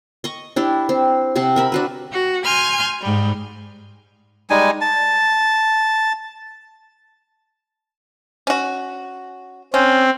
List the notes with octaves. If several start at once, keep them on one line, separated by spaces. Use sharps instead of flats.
D#5 C#6
D4 E4 G4
C4
C3 C4 F#5
A#4 E5 B5
D4 F#4 B4
F#4
G#5 C6 F6 G6
G#2 G3
G3 G#3 D#4 G#5
A5
C#4 F#4
C4 C#4